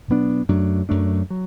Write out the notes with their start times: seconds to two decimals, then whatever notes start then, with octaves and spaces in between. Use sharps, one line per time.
0.08 B2 F#3 B3 D4
0.49 F#2 F#3 A3 D4
0.89 F#2 F#3 A3 D4
1.30 F#3